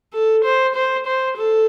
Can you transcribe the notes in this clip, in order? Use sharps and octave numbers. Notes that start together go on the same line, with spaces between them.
A4
C5
C5
C5
A4